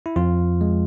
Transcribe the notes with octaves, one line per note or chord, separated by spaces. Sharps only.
E4
F2 F3 F4
G#3